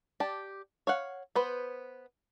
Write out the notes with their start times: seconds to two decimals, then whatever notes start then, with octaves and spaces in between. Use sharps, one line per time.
0.20 G4 D5 A5
0.87 C#5 F5 F#5
1.36 B3 B4 C5